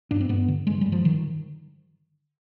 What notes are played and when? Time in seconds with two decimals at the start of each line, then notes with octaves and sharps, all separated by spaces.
0.11 G2 D4
0.20 C4
0.29 G2 B3
0.48 D3
0.67 G2 G#3
0.81 G2 G3
0.92 F3
1.04 D3 D#3